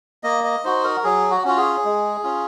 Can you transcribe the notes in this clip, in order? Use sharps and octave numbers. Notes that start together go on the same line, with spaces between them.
A#3 D#5
D#5
D#4 F#4 C5
A#4
F#3 G#4
F#4
C#4 F4 F#4
G#4
G#3
C#4 F4